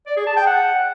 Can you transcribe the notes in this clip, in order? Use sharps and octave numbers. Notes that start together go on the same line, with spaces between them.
D5
G#4
A5
G5
F#5